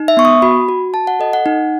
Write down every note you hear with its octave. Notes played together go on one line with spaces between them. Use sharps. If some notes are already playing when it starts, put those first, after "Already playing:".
Already playing: D#4
E5
B3 C#6
D#6
F#4 B5
F#4
F#4 A5
F#5
A4 D#5
F#5
D#4